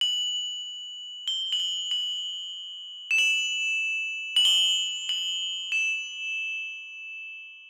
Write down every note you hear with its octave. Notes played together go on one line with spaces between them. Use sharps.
F#7
G7
F#7
G7
F#7
E7
F#7
F#7
G7
F#7
E7